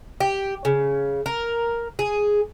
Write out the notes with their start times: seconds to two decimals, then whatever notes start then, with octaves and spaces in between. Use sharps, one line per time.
0.20 G4
0.65 C#3
1.26 A#4
1.99 G#4